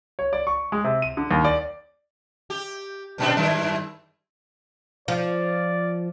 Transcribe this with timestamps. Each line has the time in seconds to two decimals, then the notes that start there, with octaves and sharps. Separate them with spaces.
0.19 C#5
0.33 D5
0.47 C#6
0.72 G#3
0.84 C3
1.02 D#7
1.17 D3
1.31 D#2
1.44 D5
2.50 G4
3.18 G2 A#2 D4
3.37 F#2 D#3 E4
5.08 F3 D5